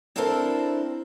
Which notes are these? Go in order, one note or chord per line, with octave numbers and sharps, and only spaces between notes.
C4 D4 E4 A4 A#4 C5